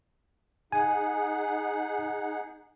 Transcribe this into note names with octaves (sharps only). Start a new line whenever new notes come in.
D#4 G#4 F#5 G#5